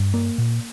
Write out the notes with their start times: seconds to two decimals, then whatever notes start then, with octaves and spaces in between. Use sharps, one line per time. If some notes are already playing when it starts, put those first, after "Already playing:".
Already playing: G2
0.14 A#3
0.38 A#2